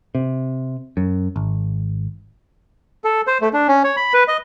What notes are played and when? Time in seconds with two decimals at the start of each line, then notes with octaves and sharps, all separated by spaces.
0.15 C3
0.97 F#2
1.36 G#1
3.04 A4
3.27 C5
3.41 A3
3.53 D4
3.68 C#4
3.84 C#5
3.97 B5
4.13 B4
4.28 D#5